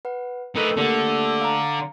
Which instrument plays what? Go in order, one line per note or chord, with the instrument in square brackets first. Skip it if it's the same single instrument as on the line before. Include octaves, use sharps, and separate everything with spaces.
[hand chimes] B4 F#5
[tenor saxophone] A3 [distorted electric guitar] D#4 B4 [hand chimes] A#4
[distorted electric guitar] D3 [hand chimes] A#3 G4
[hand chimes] F5 A#5